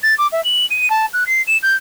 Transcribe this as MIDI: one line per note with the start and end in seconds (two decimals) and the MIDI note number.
0.03 0.14 93
0.18 0.27 86
0.32 0.43 76
0.44 0.65 102
0.70 0.89 99
0.90 1.05 81
1.13 1.26 90
1.26 1.41 96
1.47 1.57 100
1.62 1.76 91